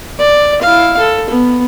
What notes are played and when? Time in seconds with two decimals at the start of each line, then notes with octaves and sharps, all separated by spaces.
0.19 D5
0.61 E4 F5
0.99 A4
1.30 B3